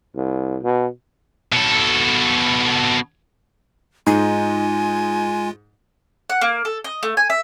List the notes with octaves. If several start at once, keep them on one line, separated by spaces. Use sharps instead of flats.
C2
B2
B2 A4
G#2 G#3 D#4 F4 G#5
F#5
A#3
A4
D#5
A3
G#5
E5